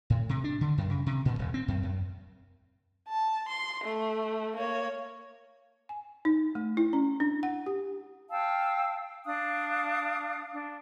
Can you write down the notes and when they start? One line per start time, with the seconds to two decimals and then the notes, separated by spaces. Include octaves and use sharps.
0.10 A2
0.29 C3
0.44 D4
0.61 D3
0.78 F#2
0.90 C#3
1.06 C3
1.25 A#2
1.39 D#1
1.54 C4
1.68 F#2
1.83 F#2
3.09 A5
3.49 C6
3.84 A3
4.57 A#3 C#5
5.89 G#5
6.25 D#4
6.55 A3
6.77 E4
6.93 C#4
7.20 D4
7.43 F#5
7.66 G4
8.30 F5 G5 A5 E6
9.26 D4 F5 D#6 F#6
10.52 D4